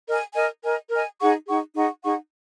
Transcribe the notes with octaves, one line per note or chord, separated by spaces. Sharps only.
A#4 D#5 G#5
A#4 D#5 G#5
A#4 D#5 G#5
A#4 D#5 G#5
D#4 G#4 F#5 C#6
D#4 G#4 F#5 C#6
D#4 G#4 F#5 C#6
D#4 G#4 F#5 C#6